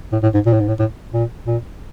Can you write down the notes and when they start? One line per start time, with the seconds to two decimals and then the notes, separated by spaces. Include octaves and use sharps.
0.12 A2
0.23 A2
0.34 G#2
0.46 A#2
0.53 A2
0.60 G#2
0.68 A2
0.79 A2
1.14 A#2
1.47 A#2